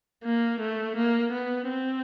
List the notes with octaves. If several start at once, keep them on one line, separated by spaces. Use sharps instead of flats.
A#3
A3
A#3
B3
C4